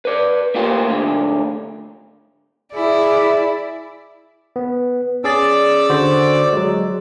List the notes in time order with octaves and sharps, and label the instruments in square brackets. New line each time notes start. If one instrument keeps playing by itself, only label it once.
[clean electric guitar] B4 D5
A3 A#3 F4 G4 C5
D2 G#2 D3
[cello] E4 [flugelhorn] G#4 [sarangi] D5
[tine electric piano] B3
[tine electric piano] C#4 G#4 A6 [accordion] D5 D6 E6
[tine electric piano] D3 F#4 C5
F#3 G#3